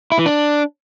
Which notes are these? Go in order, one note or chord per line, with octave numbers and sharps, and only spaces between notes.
E4
E3
D4